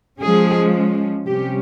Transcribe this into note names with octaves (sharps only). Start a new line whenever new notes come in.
F3 G#3 C#4 G#4
C3 G3 C#4 G4